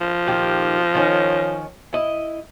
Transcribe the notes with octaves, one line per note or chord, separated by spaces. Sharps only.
F3
A#2 D#3 G4
D#3 C#4
E4 D#5